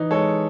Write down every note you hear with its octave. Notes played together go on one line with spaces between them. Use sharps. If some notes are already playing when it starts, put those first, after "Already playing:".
Already playing: E3 D#4
G#3 A4 C#5